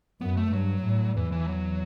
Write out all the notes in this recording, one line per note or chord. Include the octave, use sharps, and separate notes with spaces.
F#2 B3
A3
G2 F#3
A2
E2 E3
E3
F#3